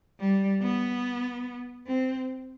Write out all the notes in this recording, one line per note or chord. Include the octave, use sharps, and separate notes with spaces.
G3
B3
C4